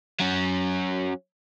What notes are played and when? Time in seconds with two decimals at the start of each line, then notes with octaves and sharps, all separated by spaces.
0.20 F#3 C#4